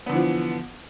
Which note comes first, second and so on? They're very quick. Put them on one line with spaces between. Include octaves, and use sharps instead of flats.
B3 D3 E3 F3